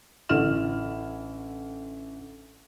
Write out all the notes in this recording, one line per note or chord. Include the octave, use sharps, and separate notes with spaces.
A1 D3 E4 F6 E7